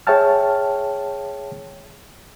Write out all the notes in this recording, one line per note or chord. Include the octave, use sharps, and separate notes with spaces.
G#4 C#5 E5 G5 A5 F6